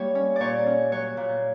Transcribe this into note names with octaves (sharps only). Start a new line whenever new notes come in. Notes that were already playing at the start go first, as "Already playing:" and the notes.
Already playing: G3 A#3 C#5
C#4
A#2 C#5 D5
C#4
F#3 C#5
A#2